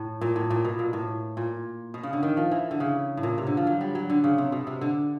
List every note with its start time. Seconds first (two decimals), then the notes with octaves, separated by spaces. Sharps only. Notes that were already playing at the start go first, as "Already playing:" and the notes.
Already playing: A2
0.21 A#2
0.36 A2
0.50 A#2
0.65 B2
0.79 A#2
0.93 A2
1.37 A#2
1.94 B2
2.03 C#3
2.13 D3
2.23 D#3
2.37 F3
2.51 E3
2.71 D3
2.80 C#3
3.17 A2
3.23 A#2
3.38 C3
3.47 D3
3.57 F3
3.67 F#3
3.81 G3
3.95 F#3
4.10 D3
4.24 C#3
4.38 C3
4.52 B2
4.67 C3
4.81 D3